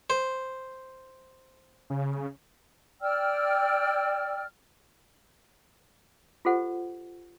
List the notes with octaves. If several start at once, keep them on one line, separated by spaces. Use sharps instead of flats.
C5
C#3
D5 G5 E6 F6
F4 G4 A4 C5 F#5